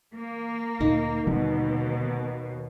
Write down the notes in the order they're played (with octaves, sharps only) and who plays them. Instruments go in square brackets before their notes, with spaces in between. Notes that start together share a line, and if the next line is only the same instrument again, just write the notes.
[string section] A#3
[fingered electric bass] D2 A#2 [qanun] D#4
[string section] D#2 B2 [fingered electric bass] D3 G3 B3